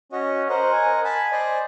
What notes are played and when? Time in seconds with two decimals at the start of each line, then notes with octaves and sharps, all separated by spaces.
0.12 C#4 F#4 D#5
0.49 A#4 C5 D#5 F#5
0.72 G#5
1.05 G#5 A5 B5
1.32 C5 D5 D#5